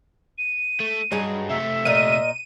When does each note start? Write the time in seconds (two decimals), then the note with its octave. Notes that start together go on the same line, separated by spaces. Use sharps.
0.38 D#7
0.80 A3
1.12 G2 F#3 D#4 G#4
1.49 C3 A3 E5
1.85 A#2 A#4 D#5 D#7